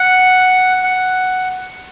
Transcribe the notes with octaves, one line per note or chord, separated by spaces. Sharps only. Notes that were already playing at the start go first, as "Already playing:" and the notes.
Already playing: F#5
F#5